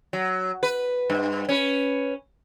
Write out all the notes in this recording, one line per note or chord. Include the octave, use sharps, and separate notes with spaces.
F#3
B4
G2
C#4 B4